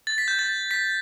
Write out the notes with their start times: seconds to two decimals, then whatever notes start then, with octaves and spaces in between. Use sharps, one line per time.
0.07 A6
0.18 B6
0.28 G6
0.39 A6
0.71 B6